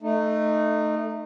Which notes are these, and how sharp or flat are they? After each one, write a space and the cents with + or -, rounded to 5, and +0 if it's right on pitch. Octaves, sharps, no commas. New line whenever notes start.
A3 +0 D#4 -20